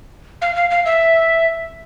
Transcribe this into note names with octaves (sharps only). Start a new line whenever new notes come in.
F5
F5
F5
E5